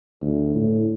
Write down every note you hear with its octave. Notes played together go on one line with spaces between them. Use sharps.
D2
A2